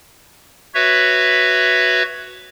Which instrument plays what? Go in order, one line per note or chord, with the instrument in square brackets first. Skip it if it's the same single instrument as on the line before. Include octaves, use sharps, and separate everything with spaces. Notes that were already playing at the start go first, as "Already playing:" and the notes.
[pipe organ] F#4 B4 C#5 E5